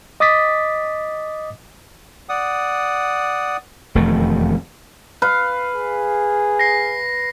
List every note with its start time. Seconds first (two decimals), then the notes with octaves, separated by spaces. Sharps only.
0.20 D#5 D6 D#6 A6 B6
2.29 D5 F#5 D#6
3.95 E1 F2 D#3 A3
5.22 B4 F5
5.76 G#4
6.59 A#6 C7